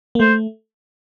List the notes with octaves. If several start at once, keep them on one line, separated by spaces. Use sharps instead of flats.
A#3
A3 C5